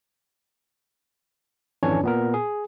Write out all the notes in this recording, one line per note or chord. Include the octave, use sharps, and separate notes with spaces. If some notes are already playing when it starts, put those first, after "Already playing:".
G#1 F2 E3 C#4 D4 C#5
A#2 B3 A#4
G#4